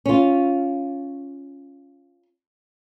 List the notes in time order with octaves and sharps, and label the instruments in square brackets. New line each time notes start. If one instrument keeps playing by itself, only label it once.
[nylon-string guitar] C#4 F4